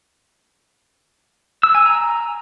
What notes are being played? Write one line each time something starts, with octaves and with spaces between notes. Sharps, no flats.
E6
G#5
A#5